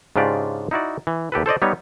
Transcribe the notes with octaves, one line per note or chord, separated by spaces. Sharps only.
G#2 C#3 D4 F4 G4 D5
D#4 E4 F#4 D5
E3
D#2 G4 A4 B4
A4 C5 D5 D#5
G3 B3 D#4 C#5